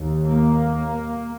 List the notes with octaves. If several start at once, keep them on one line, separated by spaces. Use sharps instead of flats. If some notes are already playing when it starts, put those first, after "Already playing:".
Already playing: D#2
A#3